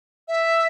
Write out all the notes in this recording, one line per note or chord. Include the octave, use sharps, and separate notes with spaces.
E5